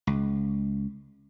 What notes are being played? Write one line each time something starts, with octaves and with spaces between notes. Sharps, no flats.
C#2